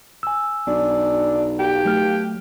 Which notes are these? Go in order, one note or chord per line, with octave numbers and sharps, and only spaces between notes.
G#5 E6
B1 D4
G4
F#3 A3 F6